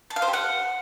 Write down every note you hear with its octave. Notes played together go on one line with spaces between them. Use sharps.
A5
F5
C5
G4
F#5